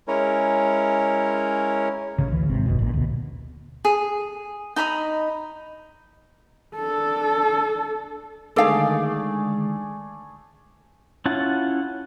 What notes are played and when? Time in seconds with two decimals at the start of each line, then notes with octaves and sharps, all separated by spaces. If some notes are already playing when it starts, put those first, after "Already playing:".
0.08 G#3 C#4 E4 A#4 C#5
2.18 A1 C#3
2.32 D2 E3
2.49 G#1 C3 C4
2.66 G1 F2 B2
2.79 A1 A#2
2.93 D2 B2
3.85 G#4
4.76 D#4 A#5 B5 D#6
6.76 D4 A4
8.56 D3 D#3 G#3 A3 G#4 A4 D5 F5
11.26 C#4 E4 F4 F#5 A5